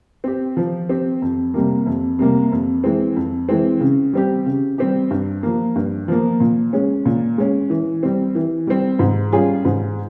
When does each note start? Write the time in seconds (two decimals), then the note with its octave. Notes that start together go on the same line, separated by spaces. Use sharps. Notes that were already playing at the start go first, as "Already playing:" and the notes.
0.24 C4 G4
0.57 F3
0.89 C4 G4
1.22 F2
1.54 C3 G3 A#3
1.86 F2
2.19 C3 G3 A#3
2.52 F2
2.84 E3 G#3 C4
3.16 F2
3.49 E3 G#3 C4
3.81 C#3
4.13 G3 C4 G4
4.46 C#3
4.78 G3 C4 G4
5.11 G2
5.43 F3 A#3
5.76 G2
6.08 F3 A#3
6.40 A#2
6.73 G#3 C#4
7.06 A#2
7.38 G#3 C#4
7.70 E3
8.03 G3 C4
8.35 E3
8.67 G3 C4
8.99 G#2
9.32 G3 C#4 F4 G#4
9.65 G#2